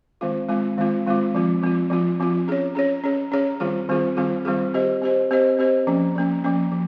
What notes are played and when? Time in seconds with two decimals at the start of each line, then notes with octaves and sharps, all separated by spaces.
0.21 D#3 G#3 C4 F4
0.49 D#3 G#3 C4 F4
0.78 D#3 G#3 C4 F4
1.06 D#3 G#3 C4 F4
1.35 F3 C4 F4
1.63 F3 C4 F4
1.90 F3 C4 F4
2.20 F3 C4 F4
2.48 C#4 G#4 C#5
2.75 C#4 G#4 C#5
3.04 C#4 G#4 C#5
3.32 C#4 G#4 C#5
3.60 D#3 G3 C4 F4 G#4
3.89 D#3 G3 C4 F4 G#4
4.17 D#3 G3 C4 F4 G#4
4.45 D#3 G3 C4 F4 G#4
4.74 C4 G4 C5 D#5
5.02 C4 G4 C5 D#5
5.31 C4 G4 C5 D#5
5.59 C4 G4 C5 D#5
5.87 F3 A#3 C#4
6.15 F3 A#3 C#4
6.44 F3 A#3 C#4
6.72 F3